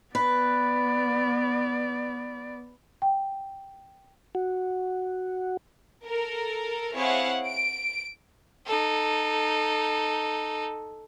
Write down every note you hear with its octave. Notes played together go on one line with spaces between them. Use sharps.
B3 B4 D5
G5
F#4
A4 A#4
C4 E4 G#4 C#5 F5 F#5
D7
D#4 A4